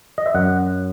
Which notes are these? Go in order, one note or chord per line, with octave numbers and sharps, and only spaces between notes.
D#5
E5
F#2 F#5